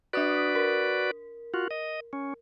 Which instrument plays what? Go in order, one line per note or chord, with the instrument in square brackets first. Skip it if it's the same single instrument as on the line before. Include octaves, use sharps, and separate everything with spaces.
[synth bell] D4 D#6 B6 [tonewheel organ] F#4 B4 D5
[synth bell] A#4
[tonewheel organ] F4 F#4
D#5
C#4